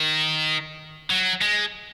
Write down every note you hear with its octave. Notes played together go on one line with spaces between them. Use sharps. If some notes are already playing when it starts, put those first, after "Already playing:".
Already playing: D#3
F#3
G#3